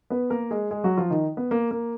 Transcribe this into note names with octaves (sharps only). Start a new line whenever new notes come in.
B3 B4
A#3 A#4
G#3 G#4
G#3 G#4
F#3 F#4
F3 F4
D#3 D#4
B3
A#3
A#3